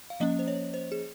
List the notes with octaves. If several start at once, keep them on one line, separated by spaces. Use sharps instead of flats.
F5
F3 A#3 C#4 D#5
C5
C#5
C5
G#4